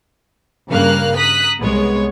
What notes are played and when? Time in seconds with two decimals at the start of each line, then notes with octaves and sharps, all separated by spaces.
0.71 G2 C#3 A#3 F5 F6 F#6
1.16 A#5 D#6 F#6 B6
1.59 C2 G#3 B3 C#5